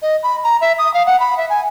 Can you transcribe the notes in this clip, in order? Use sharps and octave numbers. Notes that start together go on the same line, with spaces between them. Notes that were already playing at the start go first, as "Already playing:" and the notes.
D#5
B5
A#5
E5
D#6
F5
F#5
B5
E5
G#5